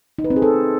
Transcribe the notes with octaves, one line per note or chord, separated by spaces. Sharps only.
D#4
B4
C4
G#4
A4